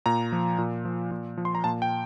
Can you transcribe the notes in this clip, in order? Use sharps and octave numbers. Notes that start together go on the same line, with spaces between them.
A#2 A#5
F3
A#2
F3
A#2
F3
C6
A#5
A#2 A5
G5